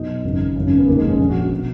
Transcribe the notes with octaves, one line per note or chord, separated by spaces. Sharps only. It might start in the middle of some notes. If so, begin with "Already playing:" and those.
Already playing: B1 B2 D#4
G#1 F#2 C#3
G#1 F#2 C#3 C#4
C#4
B3
F1 D#2 D#3 A#3
G#3
C#4
A#1 A#2
F#4
F#4
B2 F#4